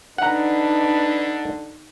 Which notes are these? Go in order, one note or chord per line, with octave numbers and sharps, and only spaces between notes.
D3 D4 D#4 B4 F#5 A#5